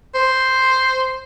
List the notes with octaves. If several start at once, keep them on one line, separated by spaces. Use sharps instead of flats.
C5